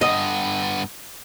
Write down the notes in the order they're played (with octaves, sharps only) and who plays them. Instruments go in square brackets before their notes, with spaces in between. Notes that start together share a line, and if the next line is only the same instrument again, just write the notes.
[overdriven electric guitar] G2 B3 [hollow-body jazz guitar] D#5